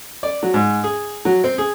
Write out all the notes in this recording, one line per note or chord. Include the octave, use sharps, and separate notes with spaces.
D5
F#3
G#2
G#4
F#3
C4
G#4